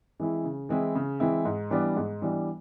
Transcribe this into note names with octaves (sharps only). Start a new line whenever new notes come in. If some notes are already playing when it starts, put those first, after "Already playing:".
E3 G#3 C4 E4
C#3
E3 G#3 C4 E4
C#3
E3 G#3 C4 E4
G#2
E3 G3 B3 D4
G#2
E3 G3 B3 D4